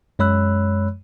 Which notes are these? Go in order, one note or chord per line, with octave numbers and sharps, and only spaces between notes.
F#2 G#3 C#5 B5 E6 F#6